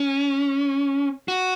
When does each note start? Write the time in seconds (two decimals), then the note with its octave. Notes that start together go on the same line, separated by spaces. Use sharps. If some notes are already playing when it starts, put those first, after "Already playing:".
Already playing: C#4
1.28 F#4